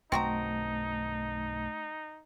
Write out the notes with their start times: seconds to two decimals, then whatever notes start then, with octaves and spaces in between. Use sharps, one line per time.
0.12 B1 G2 D#3 A3 C4 D#4 F#4 A#5